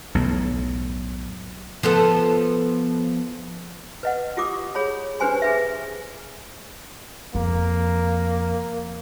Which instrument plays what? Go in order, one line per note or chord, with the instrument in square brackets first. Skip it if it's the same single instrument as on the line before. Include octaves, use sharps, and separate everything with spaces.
[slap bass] B1 E2 A2
[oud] F3 B3 A4
[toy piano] B4 D#5 F#5
F4 G4 D6 D#6
G#4 C#5 B5
D4 G4 B4 C5 G#5 C6
G#4 B4 E5
[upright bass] F2 [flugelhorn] A#3